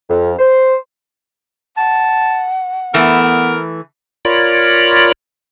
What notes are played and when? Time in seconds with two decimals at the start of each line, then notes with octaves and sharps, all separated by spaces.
0.10 F2
0.39 C5
1.77 F#5 A5
2.94 E3 A3 B3 A#4
4.25 F4 A#4 C#5 D5 B5